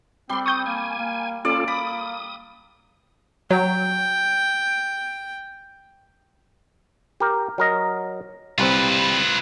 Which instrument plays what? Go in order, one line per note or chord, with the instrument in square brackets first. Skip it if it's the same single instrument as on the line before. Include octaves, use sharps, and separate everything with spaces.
[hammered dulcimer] G3 D5 [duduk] C4 [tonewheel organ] C6
[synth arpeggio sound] C#6 G6 [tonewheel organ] D#6
[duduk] A#3 [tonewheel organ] G#5
[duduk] A#3
[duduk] A#3 [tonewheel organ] C#4 F4 A4 [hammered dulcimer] D5
[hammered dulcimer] B5 [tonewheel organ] D#6
[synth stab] F#3 [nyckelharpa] G5
[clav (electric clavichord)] G4 A#4
F#3 A#4 D#5
[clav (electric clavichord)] C2 G3 C4 [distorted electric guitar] F4 B4